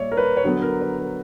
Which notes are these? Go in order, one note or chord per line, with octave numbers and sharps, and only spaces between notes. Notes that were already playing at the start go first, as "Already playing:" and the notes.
Already playing: A#2 G3 A#3 C#5 D5 E5
A#4
B4
C#5
D3 F#3 B3 B4
A#4
B4
A#4